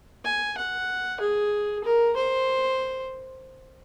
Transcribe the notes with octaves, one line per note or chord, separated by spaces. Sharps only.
G#5
F#5
G#4
A#4
C5